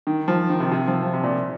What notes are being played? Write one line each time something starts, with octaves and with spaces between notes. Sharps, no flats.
D#3
F3
D#3
C3
C3
F3
F3
C3
A#2